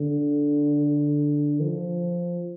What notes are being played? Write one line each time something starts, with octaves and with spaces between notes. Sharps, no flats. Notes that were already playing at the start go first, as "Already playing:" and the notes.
Already playing: D3
F3